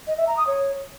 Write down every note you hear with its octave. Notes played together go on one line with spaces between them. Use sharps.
D#5
E5
A#5
D#6
C#5